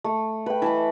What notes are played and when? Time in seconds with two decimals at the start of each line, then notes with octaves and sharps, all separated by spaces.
0.04 A3
0.46 B4 G5 B5
0.62 E3 A5 B5